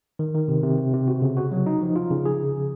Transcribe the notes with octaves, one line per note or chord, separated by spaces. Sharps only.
D#3
D#3
C3
C3
C3
C3
F#4
C#3
F#4
F#3
D#4
F3
F4
C#3
G#4